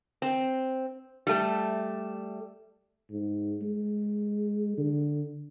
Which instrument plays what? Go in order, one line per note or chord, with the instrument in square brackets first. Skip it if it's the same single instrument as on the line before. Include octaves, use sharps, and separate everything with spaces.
[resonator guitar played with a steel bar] C4
G3 A3
[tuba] G#2
G#3
D3